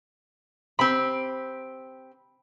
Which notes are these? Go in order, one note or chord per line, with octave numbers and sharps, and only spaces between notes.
C4 G4 B5